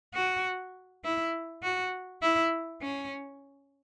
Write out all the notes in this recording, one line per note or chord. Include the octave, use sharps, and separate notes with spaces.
F#4
E4
F#4
E4
C#4